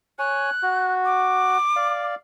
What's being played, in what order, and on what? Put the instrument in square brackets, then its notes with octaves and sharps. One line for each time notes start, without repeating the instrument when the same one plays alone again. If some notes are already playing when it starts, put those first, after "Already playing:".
[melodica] C#5 G#5 [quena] F#6
[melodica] F#4
[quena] D6
[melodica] D5 F5